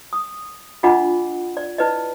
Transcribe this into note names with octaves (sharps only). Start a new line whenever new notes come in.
D#6
D4 F4 D#5 F#5 B5 D6
D5
E4 B4 D5 D#5